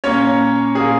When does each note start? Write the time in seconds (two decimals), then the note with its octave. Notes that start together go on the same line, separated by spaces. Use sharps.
0.04 A#2 A#3 C#4 C#5
0.75 A#2 A#3 G#4 G#5